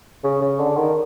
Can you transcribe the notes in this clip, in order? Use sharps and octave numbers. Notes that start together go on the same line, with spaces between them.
C#3
C#3
D3
D#3